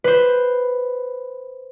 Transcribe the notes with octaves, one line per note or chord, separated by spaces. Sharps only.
B4 C5